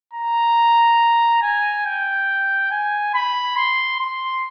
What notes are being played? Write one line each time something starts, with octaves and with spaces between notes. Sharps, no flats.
A#5
G#5
G5
G#5
B5
C6
C6